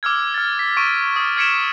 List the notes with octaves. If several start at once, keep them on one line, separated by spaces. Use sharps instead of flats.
D6 E6 F6 G#6
F6 A6
B6
C#6 D7 D#7
D#6 F6
F6 G#6 B6 C#7 D7 E7